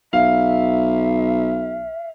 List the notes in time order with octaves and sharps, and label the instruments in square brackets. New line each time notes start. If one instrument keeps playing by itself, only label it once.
[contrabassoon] B1 [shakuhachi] E5 [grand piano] F5